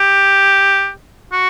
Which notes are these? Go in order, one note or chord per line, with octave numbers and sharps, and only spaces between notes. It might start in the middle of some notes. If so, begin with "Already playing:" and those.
Already playing: G4
F#4